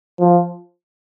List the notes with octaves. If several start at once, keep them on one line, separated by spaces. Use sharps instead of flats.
F3